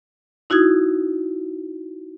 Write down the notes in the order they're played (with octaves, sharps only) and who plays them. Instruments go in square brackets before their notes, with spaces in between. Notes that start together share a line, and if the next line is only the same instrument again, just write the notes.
[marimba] D#4 E4 F#4 D#6 G#6